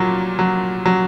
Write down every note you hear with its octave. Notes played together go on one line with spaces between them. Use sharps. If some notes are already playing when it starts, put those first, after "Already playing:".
Already playing: A#2 F#3
F#3
F#3